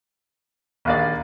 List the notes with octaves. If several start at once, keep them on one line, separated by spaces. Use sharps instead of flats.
A#1 D#2 A#3 D5 F5 A6